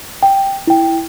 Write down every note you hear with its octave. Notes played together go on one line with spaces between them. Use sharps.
G5
E4 G5